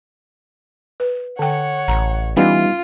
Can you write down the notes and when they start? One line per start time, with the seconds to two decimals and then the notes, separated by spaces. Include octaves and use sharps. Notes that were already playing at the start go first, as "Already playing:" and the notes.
1.00 B4
1.39 D3 C#5 F#5 G5
1.88 A1 A#5
2.37 E3 G3 B3 C#4 D#4 F4